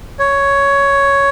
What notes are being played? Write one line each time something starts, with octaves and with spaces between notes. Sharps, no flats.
C#5